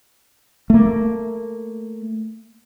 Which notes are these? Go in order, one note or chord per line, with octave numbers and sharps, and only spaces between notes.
A3 A#3